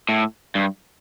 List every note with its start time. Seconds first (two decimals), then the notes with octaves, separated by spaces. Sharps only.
0.09 A2
0.55 G2